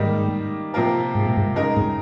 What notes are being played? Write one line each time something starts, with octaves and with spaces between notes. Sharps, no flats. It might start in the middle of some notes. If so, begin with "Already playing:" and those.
Already playing: G#2 D#3 G3 A#3 D#4 G4
C3 F3 A#3 F4 A#4
G#2
A#2
G#2
C#3 G#3 D#4 A#4
G#2